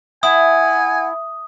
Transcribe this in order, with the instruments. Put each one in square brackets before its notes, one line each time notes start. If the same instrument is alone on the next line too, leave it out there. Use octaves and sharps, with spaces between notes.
[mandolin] E4 [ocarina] F#5 [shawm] G#5 [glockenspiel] D#6